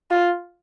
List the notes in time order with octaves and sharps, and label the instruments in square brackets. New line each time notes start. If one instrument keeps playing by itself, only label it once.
[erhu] F4